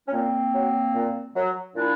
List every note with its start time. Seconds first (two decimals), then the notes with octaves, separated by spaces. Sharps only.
0.07 C#4
0.12 A#2 A#3 C4
0.53 F#3
0.94 A#2
1.35 F#3
1.75 A#2 D4 E4